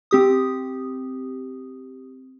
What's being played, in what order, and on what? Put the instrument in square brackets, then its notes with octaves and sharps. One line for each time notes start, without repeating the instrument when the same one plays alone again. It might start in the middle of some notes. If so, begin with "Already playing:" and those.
[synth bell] C4 G4 D#6